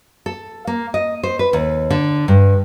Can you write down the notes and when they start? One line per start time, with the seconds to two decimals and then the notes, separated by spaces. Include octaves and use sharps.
0.26 A4
0.67 A#3
0.94 D#5
1.23 C5
1.39 B4
1.53 D#2
1.90 D3
2.28 G2